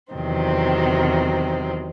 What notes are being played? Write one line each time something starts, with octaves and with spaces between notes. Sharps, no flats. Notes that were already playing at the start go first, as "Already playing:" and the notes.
E2 C3 D#3 F#3 C4